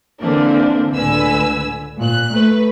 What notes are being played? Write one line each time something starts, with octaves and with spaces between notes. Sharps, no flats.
D3 E3 A#3 C4 D4
C#2 A2 D3 B4 G#5 E6
A#2 F#6
A3 B4